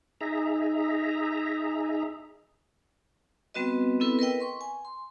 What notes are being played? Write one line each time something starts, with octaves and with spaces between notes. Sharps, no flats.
D#4 G#4 E5 A#5
G3 B3 C4 F#4 B4 D#5
B3 C4 E4 A4 B4
A#4 B4 D#5 G5
C6 C#6
G#5
C6